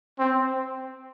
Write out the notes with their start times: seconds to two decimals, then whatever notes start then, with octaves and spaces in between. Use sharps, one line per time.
0.19 C4